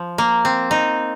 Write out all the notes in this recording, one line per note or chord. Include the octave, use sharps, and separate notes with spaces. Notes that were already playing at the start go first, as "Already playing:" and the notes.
Already playing: F3
A#3
C4
D#4